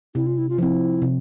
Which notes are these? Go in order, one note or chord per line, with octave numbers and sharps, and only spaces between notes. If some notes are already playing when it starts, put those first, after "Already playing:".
C3 E4
F4
E4
F4
F3 C4 E4
C3